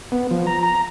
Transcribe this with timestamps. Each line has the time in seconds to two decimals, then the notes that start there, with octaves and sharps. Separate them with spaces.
0.12 B3
0.31 F3
0.47 A#5
0.63 A#5